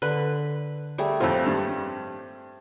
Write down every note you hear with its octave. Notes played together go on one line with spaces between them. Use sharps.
D3 B4 F#6
G3 A3 G#4
F2 A2 C4 F4
G2